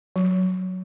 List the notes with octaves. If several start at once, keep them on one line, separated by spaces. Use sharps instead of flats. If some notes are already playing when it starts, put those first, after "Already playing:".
F#3